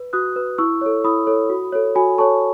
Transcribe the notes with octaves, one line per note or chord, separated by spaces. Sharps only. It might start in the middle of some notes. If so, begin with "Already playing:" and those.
Already playing: B4
F#4 D#6 F#6
B4
E4 C#6 E6
A4 C#5
E4 B5 D#6
A4 C#5
F#4
A4 C#5
F#4 G#5 B5
A4 C#5 A5 C#6